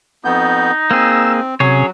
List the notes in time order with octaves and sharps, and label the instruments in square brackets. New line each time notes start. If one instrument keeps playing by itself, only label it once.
[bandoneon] F2 B3 G6 [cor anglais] D#4
[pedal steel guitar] A#3 G#4 [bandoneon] C4 [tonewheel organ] E6
[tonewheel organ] C3 [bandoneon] F#3 [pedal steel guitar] C#4 G#4 C#5